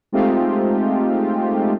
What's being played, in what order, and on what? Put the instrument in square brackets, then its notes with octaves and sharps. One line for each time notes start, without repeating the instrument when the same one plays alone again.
[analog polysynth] G#3 A3 C4 D#4 F4 G4